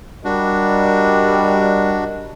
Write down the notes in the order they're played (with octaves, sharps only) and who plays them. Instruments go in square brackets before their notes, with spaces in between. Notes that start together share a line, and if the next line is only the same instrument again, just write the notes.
[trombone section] G3 [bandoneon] D4 F#4 [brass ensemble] A#4 D#5